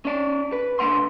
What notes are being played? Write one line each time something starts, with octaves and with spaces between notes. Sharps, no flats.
C#4 D5
B4
C#2 D3 A3 F#5 C6